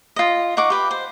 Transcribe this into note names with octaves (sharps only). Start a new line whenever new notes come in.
F4 D#5
D#4 F#5 C#6 D6
G4 B4
C5